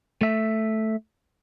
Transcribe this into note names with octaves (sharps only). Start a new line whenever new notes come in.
A3 E5